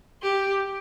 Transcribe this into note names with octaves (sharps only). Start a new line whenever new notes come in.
G4